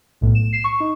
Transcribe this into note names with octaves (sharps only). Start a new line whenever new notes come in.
B1 A2
E7
C7 E7
C#6
D#4